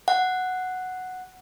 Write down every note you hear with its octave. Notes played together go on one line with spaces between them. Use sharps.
F#5